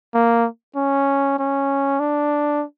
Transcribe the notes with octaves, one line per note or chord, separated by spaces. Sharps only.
A#3
C#4
C#4
D4